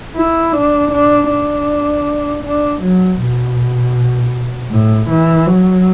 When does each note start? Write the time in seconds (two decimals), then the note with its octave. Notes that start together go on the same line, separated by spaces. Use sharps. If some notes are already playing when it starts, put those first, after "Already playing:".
0.16 E4
0.53 D4
0.91 D4
1.29 D4
2.44 D4
2.82 F#3
3.20 B2
4.71 A2
5.10 E3
5.47 F#3